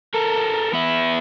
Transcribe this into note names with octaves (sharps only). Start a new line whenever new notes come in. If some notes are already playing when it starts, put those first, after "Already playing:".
A4 A#4
B3 E4